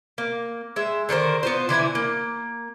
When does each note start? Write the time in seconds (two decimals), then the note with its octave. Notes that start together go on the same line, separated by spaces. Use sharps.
0.18 A#3
0.76 G#3 E5
1.09 D3 D#3 A#4 C5
1.43 B3 F4 C5
1.69 D3 E3 E4 G#5
1.95 A#3